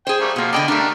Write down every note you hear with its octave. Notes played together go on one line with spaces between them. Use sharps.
G#4 C5 G5
G3 A3 A#3
B2 F3 A#3 F4
D3 D5 D#5 G5 A5 B5
G3 A3 D4 A#4